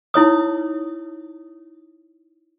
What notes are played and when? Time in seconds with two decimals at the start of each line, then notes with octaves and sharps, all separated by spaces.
0.14 D#4 E4 C#5 D#6